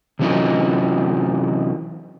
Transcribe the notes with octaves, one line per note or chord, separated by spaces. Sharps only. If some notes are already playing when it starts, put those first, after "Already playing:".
C3 E3 F#3 C#4 D#4 F4